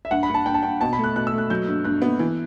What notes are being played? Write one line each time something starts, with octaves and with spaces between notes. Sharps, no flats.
E5
G2 F#5
B5
G2 A5
G2 G5
A5
G2 G5
B2 A5
B5
A3
F#6
B2 F#6
E6
A3
F#6
F#3 G6
G2
G2 F#6
B3
E3